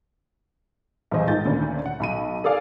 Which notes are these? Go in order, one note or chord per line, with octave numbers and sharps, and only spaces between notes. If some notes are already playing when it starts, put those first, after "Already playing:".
B1 E2 E3 C5 D#5 G#5
G#2 D#3 F4 G6 A6
D2 A#2 D3 D#3 C#4
F#5
B1 B5 D#7
G#4 A4 D5 F5 G#5